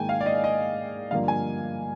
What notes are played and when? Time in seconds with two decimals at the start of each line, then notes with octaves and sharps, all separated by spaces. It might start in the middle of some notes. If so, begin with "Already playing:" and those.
Already playing: G#2 D#3 A#3 G5 G#5
0.09 F5
0.21 D5
0.26 D#5
0.44 D#5
1.11 G2 D3 F3 A#3 F5
1.28 G#5